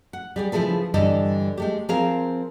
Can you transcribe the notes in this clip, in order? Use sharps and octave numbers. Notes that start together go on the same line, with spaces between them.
F#5
G3 G#4 D5
C#3 F3 E4 G#4 A4 B4
G2 D3 E3 G3 A4 D#5
G#3 A3 G4
F3 C4 G#4 A#4 F5